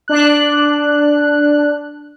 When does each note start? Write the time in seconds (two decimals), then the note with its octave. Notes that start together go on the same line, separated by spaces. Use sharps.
0.08 D4 F#6